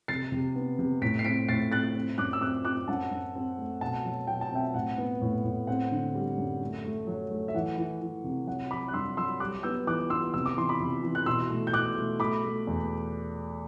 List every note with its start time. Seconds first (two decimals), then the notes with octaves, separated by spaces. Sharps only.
0.08 C3 A6 C7
0.32 C3
0.55 B3
0.79 C3
1.02 A2 B6 D7
1.19 C7
1.25 C4 B6 D7
1.48 A2 A6 C7
1.72 C4 F#6 A6
1.95 C4
2.18 F#2 D6 F#6
2.33 E6
2.41 C4 D6 F#6
2.64 C4 D6 F#6
2.88 F#2 F#5 A5
3.11 F#2
3.35 C4
3.58 A3
3.81 B2 F#5 A5
4.05 F#3
4.27 B2 G5
4.41 A5
4.52 C4 E5 G5
4.74 A2 F#5
4.98 B3
5.21 A2
5.44 A2
5.67 C4 F#5
5.92 D3
6.15 G3
6.37 F#2
6.61 A3
6.85 A3
7.07 F#3
7.31 A3
7.48 E5
7.55 E3 F#5
7.78 E3
8.01 E3
8.24 C3
8.47 F#3 F#5
8.71 F#3 B5 D6
8.88 F#6
8.93 G2 C6 E6
9.17 F#3 C6 E6
9.40 G3 D6 F#6
9.63 B3 E6 G6
9.87 E3 D6 F#6
10.10 B3 C6 E6
10.34 C3 E6
10.46 D6
10.57 E3 C6
10.69 B5 D6
10.80 C3
11.03 E3
11.15 F#6
11.26 B2 C6 E6
11.50 A3
11.67 G6
11.73 B2 D6 F#6
11.96 A3
12.20 A3 B5 D6
12.44 A3
12.67 E2